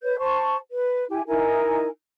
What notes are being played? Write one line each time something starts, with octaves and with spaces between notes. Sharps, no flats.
B4 C#5 G6
C5 A5 C#6
B4
E4 G4 G#5
D#4 E4 A#4 G#5